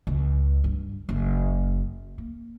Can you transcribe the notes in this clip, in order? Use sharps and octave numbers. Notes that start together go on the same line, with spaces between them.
C#2
G2
F#1
A#3